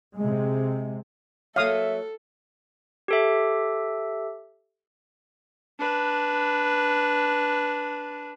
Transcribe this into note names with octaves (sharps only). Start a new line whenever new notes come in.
C3 G#3
F#3 A#3 A4 E5 F5 D#6
G4 A4 E5
D4 B4